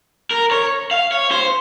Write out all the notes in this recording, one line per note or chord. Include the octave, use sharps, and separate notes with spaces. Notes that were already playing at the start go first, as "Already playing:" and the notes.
A#4
C#5
F5
C#5
C5